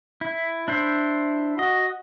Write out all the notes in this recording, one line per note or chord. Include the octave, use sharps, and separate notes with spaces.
E4
D4 E4 C5
F#4 D#5